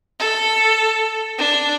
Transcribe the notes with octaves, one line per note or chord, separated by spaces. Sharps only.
A4
D4